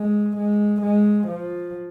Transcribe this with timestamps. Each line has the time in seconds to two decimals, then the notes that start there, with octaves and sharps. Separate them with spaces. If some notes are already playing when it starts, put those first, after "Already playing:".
Already playing: G#3
0.37 G#3
0.82 G#3
1.27 F3